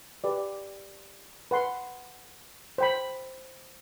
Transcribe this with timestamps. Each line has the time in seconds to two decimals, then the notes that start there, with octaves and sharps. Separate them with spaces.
0.24 G4 B4 D5
1.51 B4 F#5 C6
2.78 C5 G5 B5